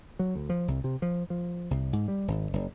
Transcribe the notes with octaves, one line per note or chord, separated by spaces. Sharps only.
F#3
D2
F3
C2
C3
F3
F3
C2
G#2
G3
G#1
F#1